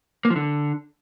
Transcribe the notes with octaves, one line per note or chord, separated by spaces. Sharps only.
A#3
F3
D3